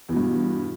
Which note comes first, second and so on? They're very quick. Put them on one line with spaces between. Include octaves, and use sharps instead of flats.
E2 B2 G2